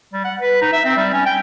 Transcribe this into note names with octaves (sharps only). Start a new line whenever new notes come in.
G3
F#5
B4
D#4
E5
C4
G3
C#4
G5